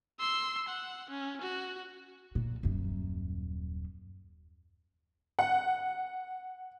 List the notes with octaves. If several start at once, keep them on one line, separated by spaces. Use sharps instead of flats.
C6 E6
F#5
C#4
F#4
A#2
D#1 F#2
F#5